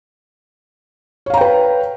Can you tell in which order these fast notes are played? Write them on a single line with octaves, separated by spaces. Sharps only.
C#5 F5 A#5 G5 B4